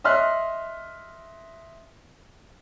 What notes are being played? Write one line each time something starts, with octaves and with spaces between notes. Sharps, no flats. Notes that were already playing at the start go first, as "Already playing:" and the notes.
D#5 E5 C6 F6 F#6